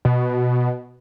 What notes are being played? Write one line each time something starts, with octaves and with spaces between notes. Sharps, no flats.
B2